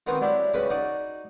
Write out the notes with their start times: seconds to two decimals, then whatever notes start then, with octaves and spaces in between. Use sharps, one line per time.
0.07 D#3 B3 C4 D#4 F#4 D#5
0.21 F#3 G3 D4 E4
0.54 G2 C#3 C#4 B4
0.70 D#4 F#4 D5